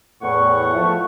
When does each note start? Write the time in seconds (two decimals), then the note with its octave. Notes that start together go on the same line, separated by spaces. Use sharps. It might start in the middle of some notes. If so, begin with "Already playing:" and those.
0.22 E2 A2 F#5 C#6
0.73 F3 A3